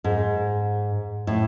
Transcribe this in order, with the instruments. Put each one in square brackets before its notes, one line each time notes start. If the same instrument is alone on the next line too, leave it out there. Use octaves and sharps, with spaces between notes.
[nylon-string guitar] G#2
A2